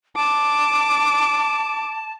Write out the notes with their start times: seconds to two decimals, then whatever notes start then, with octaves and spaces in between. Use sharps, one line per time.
0.16 A5 D6